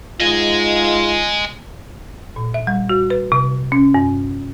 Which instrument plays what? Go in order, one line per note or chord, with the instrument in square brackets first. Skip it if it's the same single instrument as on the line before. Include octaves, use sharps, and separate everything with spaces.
[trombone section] G#2 F4 [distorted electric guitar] D#5 G#5
[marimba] A#2
E5
G3
F#4
B4
C3
C#4
G2